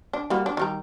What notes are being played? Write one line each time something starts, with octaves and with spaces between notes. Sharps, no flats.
D4
G3 A#3 F#4
D4
D#3 G3 A#5